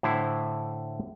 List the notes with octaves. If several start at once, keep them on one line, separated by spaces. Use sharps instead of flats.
A2 D3 E4 C5 E5